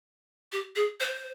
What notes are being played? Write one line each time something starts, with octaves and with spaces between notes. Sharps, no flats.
G4
G#4
C5